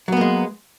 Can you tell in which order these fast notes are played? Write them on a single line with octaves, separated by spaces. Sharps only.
F#3 B3 A#3 G#3